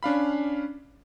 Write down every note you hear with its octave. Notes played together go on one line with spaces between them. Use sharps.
C#4 D4 F5 B5